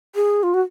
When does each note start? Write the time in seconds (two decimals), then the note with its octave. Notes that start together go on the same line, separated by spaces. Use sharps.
0.15 G#4
0.43 F4
0.54 F#4